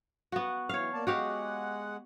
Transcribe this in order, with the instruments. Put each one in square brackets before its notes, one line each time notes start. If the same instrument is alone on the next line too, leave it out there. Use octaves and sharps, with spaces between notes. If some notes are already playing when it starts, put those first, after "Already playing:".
[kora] B3 F#4
[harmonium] E3 [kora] C#5 F5
[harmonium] A#3 D5 A5
[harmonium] G#3 F#5 [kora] F#4 G4 F5